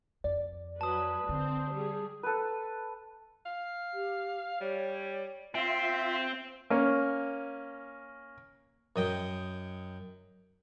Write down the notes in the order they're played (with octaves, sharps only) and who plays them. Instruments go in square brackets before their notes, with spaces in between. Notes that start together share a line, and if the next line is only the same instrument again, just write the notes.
[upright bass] F2 [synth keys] D5
[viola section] F#3 B4 [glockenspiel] A5 D#6
[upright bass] D3 [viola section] C4 C5
[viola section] G3 G#4
[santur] A4 B4
[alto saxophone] F5
[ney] G4
[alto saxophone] G3 [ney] C#5
[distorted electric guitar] C4 [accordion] F4 E5
[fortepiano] A#3 C#4
[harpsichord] F#2 D#5 G5